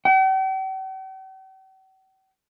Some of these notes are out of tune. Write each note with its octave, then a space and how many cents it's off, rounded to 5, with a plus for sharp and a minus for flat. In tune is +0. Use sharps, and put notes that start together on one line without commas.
G5 -45